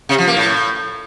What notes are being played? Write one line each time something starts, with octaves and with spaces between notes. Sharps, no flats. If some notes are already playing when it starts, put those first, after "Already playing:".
C3
F3
A#3
A2